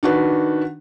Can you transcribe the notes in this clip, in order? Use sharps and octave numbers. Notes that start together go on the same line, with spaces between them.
D#3 D4 F#4 B4